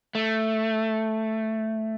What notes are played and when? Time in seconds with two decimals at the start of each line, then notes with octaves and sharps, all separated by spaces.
0.15 A3